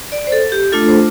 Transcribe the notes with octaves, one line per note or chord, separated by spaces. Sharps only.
D5
C5
A4
G4
A3 D4 F4 A4
C5